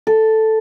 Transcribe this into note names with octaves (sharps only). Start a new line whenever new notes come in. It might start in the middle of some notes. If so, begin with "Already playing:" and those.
A4